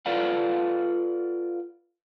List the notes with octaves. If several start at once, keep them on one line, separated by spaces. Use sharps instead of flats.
F4 A4 B4 D5 F5 F#5